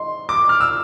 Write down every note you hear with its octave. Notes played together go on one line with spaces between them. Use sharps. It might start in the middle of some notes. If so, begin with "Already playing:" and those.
Already playing: G#3 C4 D#4 C6
D6
F6
E6